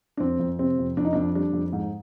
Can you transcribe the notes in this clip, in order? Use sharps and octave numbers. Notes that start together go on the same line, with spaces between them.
D4
F2 C4
F2
C3 C4
F2
F2 D4
D#4
F2 D4
G3 D4
F2
G#2